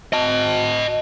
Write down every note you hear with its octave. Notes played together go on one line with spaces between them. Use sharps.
D#5 A5